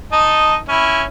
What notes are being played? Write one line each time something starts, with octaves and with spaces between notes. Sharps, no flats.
D#4 D#5 A5
C#4 E4